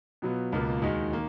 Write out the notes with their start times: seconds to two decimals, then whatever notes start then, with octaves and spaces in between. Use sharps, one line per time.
0.22 B2 F#3 B3 F4
0.52 C#2 B2 A#3 F4
0.82 D#2 D#3 G#3 D#4 F#4
1.12 D#3 A#3